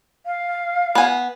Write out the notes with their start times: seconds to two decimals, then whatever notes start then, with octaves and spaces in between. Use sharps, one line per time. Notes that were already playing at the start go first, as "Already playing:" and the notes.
0.26 F5
0.95 B3 G#5